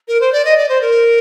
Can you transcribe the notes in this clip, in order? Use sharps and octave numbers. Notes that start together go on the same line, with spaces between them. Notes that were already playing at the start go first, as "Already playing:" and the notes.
A#4
C5
D5
D#5
D5
C5
A#4